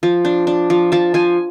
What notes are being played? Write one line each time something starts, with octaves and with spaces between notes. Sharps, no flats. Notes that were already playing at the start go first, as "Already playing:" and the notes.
F3
D4
D4
F3
F3 A5
F3 G#5